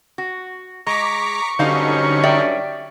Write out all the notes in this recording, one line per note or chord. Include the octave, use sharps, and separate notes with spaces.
F#4
G#3 A#5 C#6 D6 B6
G2 D3 F#3 C#4 D#4 C5 F5
D5 E5 G5